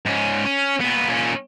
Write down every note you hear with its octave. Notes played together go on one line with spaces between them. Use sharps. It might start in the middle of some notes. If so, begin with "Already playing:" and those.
G#2 C#4
C#4
A#2 B3
A#2 C#4